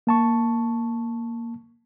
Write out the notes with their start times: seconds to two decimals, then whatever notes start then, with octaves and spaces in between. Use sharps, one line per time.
0.07 A#3 A5 C#6